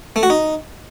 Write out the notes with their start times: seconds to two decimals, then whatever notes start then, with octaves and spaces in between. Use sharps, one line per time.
0.16 A3
0.23 F#4
0.30 D#4